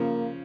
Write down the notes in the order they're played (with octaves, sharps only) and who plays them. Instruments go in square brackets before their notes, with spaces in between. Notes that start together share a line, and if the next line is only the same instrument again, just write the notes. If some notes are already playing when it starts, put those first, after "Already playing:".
Already playing: [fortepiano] C#3 F3 [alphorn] A#3